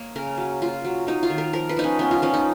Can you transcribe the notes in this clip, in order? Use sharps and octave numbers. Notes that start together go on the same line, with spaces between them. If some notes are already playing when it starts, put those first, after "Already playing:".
Already playing: A#3 C#5 D#5
C#3 A#4
F#3
A#3 F4
F#3
F#3 D#4
F4
D#3
A#4
F3 A#4
B4
F3 D#4
C#4
B3 C#4
F4
F3 C#4
D#4